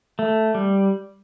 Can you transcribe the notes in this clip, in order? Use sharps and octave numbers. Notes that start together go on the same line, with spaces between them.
A3
G3